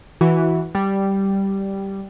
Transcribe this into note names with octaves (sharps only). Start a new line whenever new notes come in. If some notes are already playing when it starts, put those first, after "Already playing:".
E3 F#4
G3